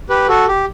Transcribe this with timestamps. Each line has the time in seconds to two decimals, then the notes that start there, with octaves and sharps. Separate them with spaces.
0.09 G4 B4
0.28 F#4 A4
0.48 G4